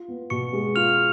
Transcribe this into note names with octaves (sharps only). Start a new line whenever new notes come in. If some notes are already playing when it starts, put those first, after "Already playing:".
Already playing: F4
B3
B2 C#6 C#7
G#3
F4 F6 F7